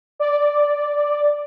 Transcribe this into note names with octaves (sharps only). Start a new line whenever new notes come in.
D5